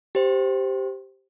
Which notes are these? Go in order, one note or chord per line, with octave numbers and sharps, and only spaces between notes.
G4 C5